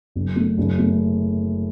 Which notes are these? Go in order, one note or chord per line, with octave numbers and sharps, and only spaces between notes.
F#1
A3
F#1
A3